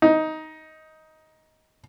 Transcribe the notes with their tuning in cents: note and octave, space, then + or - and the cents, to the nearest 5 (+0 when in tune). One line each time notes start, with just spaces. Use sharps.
D#4 +10